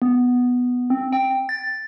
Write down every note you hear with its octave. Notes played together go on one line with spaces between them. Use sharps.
B3
C4
G5
A6